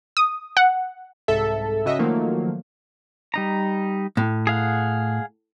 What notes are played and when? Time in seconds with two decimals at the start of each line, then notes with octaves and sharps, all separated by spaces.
0.17 D#6
0.57 F#5
1.28 C2 G#2 A4 E5
1.85 C#3 F#4 D#5 E5
1.99 D#3 F3 F#3 A3 A#3 F4
3.34 G3 D#4 A#5
4.17 A2
4.47 G#4 F5 F#5